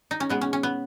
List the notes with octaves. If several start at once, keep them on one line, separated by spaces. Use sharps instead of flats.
D#4
C#4
B2 G#3 B3
C#4
C#4
B3